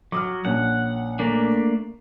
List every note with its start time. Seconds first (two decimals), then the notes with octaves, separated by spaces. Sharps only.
0.12 F#3 D6 D#6 F6
0.45 A#1 C#4 F#5
1.19 A3 A#3 D4